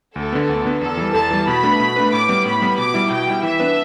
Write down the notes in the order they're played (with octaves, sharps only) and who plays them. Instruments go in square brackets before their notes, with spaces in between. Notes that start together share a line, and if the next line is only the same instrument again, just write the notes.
[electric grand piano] D2 [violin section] A4
[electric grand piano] D3 B3
D2
D3 B3
[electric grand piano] E2 [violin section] A4
[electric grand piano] E3 G3
[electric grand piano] E2 [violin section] A5
[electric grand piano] E3 G3
[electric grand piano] B2 [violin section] B5
[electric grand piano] A3 D4 B4
B2
A3 D4 B4
[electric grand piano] A2 [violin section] D6
[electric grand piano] G3 B3
[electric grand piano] A2 [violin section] B5
[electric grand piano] G3 B3
[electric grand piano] B2 [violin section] D6
[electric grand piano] G3 E4
[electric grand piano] B2 [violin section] G5
[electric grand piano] G3 E4
[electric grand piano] E3 [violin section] E5
[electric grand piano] B3 D4 B4